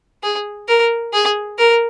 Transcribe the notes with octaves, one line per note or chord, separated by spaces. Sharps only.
G#4
A#4
G#4
A#4